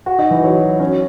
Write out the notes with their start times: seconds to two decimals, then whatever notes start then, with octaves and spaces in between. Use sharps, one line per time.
0.06 F#4
0.19 D#4
0.31 E3
0.44 F#3
0.80 C#4